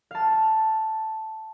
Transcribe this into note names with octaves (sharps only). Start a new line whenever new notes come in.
F5 A5